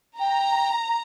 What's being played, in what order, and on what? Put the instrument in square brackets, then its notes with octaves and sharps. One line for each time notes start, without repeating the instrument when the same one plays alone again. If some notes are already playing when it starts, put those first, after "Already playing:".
[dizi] G5 [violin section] A#5